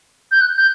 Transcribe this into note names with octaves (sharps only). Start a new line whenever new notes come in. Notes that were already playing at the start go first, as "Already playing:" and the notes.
G6
F#6
G6